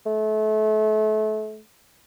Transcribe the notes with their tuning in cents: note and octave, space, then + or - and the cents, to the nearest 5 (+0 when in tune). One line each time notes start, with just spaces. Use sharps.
A3 -30